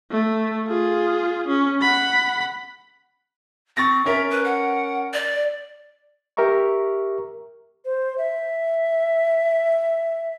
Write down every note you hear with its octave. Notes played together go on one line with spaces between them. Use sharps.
A3
F4 G#4
C#4
F#5 B5
C4 C#6 A6 A#6
C#4 A#4 E5
B4
F#5
D5
G4 A#4 E5 A#5 C#6
C5
E5